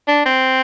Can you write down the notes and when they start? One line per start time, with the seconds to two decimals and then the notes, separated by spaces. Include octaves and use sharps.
0.08 D4
0.26 C4